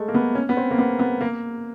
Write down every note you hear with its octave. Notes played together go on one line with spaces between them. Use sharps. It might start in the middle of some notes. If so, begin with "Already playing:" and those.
Already playing: G#3 A3
A#3
B3
C#4
B3
C4
A#3
B3
B3
A#3